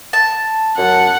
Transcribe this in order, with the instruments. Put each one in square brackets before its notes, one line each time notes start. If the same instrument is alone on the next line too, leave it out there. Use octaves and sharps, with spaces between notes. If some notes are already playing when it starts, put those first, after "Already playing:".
[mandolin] A5
[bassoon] F#2 [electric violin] F#5